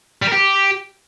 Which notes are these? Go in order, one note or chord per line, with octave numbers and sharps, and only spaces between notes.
G3
A#4
G4